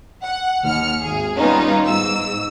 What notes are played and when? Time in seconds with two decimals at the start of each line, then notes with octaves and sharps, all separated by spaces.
0.23 F#5
0.64 D#2 F6 C#7
1.03 G#1 G#4
1.37 G3 B3 C#4 D#4 F4
1.85 G#2 E6